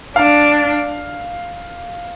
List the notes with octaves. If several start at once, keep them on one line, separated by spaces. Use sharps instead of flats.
D4 F5